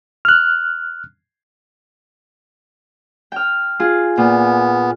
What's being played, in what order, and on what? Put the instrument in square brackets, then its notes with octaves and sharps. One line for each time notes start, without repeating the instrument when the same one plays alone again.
[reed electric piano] F6 F#6
[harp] G5 F6
F4 G#4
[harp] A#2 [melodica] B3